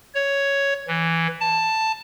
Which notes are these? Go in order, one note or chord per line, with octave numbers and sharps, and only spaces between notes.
C#5
E3
A5